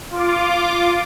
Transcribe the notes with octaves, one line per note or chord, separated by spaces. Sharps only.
F4 D6